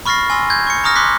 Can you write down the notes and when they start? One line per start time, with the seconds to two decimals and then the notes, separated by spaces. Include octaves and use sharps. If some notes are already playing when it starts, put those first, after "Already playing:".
0.06 B5 C#6 F6 A6 A#6 C7
0.30 G#5 C6 E6 A#6
0.50 G6 G#6
0.67 C#6 C#7
0.84 A#5 C#6 D#6 F6 A#6
0.96 C6 D6 F#6 B6